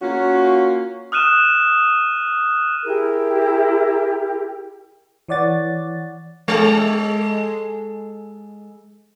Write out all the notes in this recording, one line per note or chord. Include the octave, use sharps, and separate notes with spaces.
A#3 C#4 F4 F#4
D#6 F6 F#6 D#7 E7
E4 G4 G#4 A#4
E3 C#5 D5 F#5 A6
G#3 A4